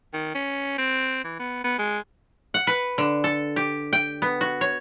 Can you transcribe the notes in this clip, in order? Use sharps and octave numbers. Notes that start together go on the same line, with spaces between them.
D#3
C#4
C4
E3
B3
B3
G#3
F#5
B4
D3
A4
G4
G5
B3
F#4
C#5